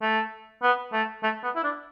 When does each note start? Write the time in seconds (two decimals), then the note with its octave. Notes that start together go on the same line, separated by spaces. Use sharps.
0.02 A3
0.62 B3
0.93 A3
1.23 A3
1.43 B3
1.55 E4
1.63 D4